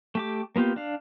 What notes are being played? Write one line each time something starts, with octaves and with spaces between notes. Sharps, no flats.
A3 G4 D6
A#3 B3 F4 G4
D4 F5